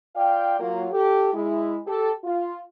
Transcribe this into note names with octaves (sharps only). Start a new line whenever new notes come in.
F4 D5 F5 G5
F#3 A#3 F4
G4 A4
G#3 E4
G4 A4
F4